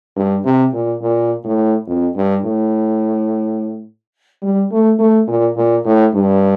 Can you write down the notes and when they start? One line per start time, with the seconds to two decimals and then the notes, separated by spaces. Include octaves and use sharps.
0.16 G2
0.45 C3
0.73 A#2
1.02 A#2
1.44 A2
1.87 F2
2.16 G2
2.44 A2
4.42 G3
4.72 A3
4.99 A3
5.27 A#2
5.56 A#2
5.85 A2
6.14 G2